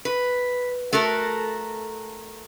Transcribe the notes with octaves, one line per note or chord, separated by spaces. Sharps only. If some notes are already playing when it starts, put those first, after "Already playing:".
B4
A3 F#4 A4 A#4